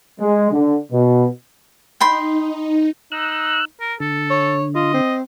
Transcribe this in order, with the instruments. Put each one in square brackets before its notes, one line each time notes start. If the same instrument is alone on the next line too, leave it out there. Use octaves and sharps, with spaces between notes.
[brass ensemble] G#3
D3
B2
[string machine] D#4 [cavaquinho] G5 B5 C6
[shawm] D#4 [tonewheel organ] E6 F#6
[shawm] A#4
[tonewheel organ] D3 [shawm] A4
[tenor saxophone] C#5
[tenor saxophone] F4 [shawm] D#5
[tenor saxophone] C4